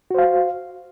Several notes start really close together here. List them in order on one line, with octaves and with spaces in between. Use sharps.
F#4 C5 F5